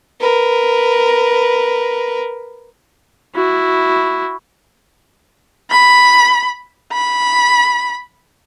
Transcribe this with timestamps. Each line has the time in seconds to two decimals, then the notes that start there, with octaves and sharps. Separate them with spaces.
0.21 A#4 B4
3.35 E4 F#4
5.70 B5
6.93 B5